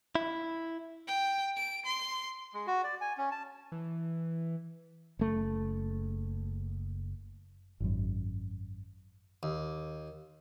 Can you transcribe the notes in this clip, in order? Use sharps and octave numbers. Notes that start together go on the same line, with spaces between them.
E4
G5
D7
C6
G#3
F#4
D5
G#5
C#4
A5
E3
F#1 A3
G#1 F#2
D#2